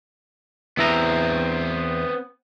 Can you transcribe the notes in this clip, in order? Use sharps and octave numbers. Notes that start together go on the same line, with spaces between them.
E2 B3 C4 E4 A#5